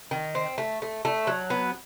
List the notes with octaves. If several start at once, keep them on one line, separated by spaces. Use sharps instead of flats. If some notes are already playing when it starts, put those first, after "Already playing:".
D#3
C4
A3
A3
A3
F#3
B3